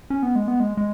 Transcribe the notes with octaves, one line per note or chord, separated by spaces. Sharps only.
C#4
B3
G#3
B3
G#3
G#3